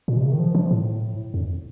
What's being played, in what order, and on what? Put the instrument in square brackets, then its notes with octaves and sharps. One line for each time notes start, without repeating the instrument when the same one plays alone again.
[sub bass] A#2
C3
C#3
D#3
F3
F3
A2
F2